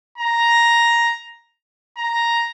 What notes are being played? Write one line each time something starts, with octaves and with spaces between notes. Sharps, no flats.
A#5
A#5